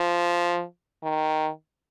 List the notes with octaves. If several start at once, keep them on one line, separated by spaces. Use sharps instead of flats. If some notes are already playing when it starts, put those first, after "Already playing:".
Already playing: F3
D#3